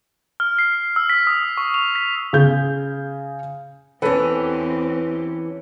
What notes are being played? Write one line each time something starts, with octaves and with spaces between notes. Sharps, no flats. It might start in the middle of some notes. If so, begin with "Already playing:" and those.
F6
C7
E6
B6
D#6
C#6
F7
B6
C#3 G#4 G6
E2 E3 C4 C#4 G4 A4 B4